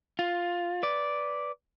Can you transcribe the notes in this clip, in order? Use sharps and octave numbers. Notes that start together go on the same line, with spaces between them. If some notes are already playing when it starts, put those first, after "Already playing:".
F4
B4 D5